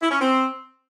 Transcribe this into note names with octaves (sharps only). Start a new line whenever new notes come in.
E4
C#4
C4